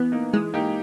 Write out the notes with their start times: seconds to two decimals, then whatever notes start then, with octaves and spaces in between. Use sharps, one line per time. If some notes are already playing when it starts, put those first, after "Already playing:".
Already playing: E3 B3
0.12 A#3 D#4
0.33 E3 G#3
0.54 A#3 D#4 G4